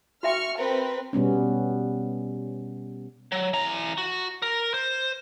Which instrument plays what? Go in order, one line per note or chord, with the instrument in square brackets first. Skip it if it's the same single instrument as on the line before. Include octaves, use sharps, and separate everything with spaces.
[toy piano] F#4 E5 G5 [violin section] C#6 F6
[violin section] C4 A#4 B4
[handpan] B2 G3 B3 C#4
[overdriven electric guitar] F#3
E3 A#5
F#4
A#4
C5